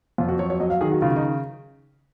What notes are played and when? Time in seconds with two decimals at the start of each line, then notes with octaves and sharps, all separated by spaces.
0.18 F2 F4
0.28 F#4
0.39 F#3 C#5
0.50 C#5
0.60 F#3 D#5
0.70 F5
0.81 D#3 G#4
0.92 F#4
1.02 C#3 F4
1.16 D#4